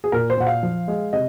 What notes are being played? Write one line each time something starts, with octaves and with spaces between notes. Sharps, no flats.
G#4
A#2 A#4
C5
A#2 F#5
F5
F3
G#3
C3 D#5